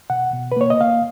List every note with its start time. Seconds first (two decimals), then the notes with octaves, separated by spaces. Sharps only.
0.10 B2 F#5
0.33 B2
0.52 B4
0.57 A#3 C#5
0.70 D#5
0.80 A#3 F5